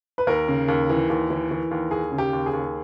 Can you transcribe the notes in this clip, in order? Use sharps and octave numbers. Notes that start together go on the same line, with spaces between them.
B4
D#2 A#4
C#3
D#2
E3
D#2
E3
E3
D#2
D#2 G#4
C#3
G4
D#2
G#4
D#2